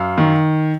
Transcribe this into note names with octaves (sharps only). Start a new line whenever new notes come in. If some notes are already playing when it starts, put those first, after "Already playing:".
Already playing: F#2 F5
D#3